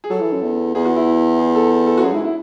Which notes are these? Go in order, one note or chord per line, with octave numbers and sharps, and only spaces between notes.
G#4
F#3 A4
E3
F#2
E2
E2 G#4
F#4
E4
G#4
A4
A4
A4
F#4
F#2 G#4
G#2 E4
E4